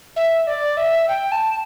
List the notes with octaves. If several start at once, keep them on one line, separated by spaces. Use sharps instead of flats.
E5
D5
E5
G5
A5